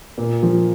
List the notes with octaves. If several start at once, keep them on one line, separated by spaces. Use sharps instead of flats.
A#2
F3